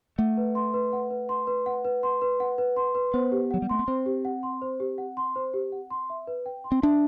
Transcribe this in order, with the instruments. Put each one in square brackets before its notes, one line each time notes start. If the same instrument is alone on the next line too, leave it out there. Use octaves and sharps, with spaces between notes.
[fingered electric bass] A3 [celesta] F#5
[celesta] B4
C6
B4
F#5
B4
C6
B4
F#5
B4
C6
B4
F#5
B4
C6
B4
[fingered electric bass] B3 [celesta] C5
[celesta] G4
[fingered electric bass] F#3 [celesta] F#5
[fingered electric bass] G3
[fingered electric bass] A3 [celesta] C6
[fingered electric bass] B3
[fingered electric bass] C4 [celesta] C5
[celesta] G4
F#5
C6
C5
G4
F#5
C6
C5
G4
F#5
C6
E5
B4
G5
C6
[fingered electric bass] C4
[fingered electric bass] D4 [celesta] E5